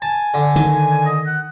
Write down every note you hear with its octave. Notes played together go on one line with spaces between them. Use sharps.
G#5 A5
D3
D#3
D#5
F#5